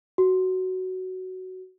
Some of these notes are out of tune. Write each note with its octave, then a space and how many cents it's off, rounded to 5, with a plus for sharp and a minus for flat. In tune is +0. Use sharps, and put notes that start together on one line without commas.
F#4 +10